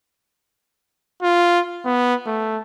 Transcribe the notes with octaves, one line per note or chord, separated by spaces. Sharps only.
F4
B3
A3